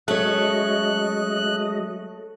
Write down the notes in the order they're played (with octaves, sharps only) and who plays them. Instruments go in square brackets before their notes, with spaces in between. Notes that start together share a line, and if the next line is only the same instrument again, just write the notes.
[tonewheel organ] F#3 G#3 D#5 [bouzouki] A3 [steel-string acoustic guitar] C#4 C#5 [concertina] F#6